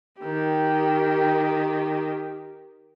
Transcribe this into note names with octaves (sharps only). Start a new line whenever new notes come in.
D#3 G4